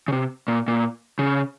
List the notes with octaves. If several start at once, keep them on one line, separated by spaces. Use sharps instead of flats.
C#3
C3
A#2
A#2
C#3